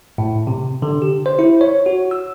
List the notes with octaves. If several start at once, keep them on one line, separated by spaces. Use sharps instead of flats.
A2
C3
D3
G4
C5
E4
C#5
F#4
E6